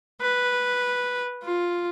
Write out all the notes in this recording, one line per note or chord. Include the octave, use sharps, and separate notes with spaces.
B4
F4